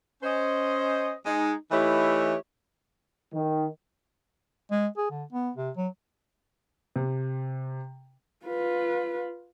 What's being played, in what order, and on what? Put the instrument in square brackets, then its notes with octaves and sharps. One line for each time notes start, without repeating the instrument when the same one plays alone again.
[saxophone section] C#4 C5 D#5
G#3 D#4
E3 A3 D#4 E4 G4 C#5
[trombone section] D#3
[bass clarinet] G#3
G#4
D3
B3
C3
F#3
[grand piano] C3
[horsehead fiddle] F4 B4